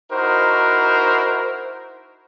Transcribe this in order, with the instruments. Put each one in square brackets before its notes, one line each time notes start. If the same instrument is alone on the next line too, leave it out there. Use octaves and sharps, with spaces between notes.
[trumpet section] D#4 E4 F#4 A#4 C5